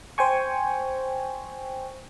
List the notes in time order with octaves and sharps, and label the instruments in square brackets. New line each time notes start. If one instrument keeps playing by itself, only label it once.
[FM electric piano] C5 G5 G#5 C#6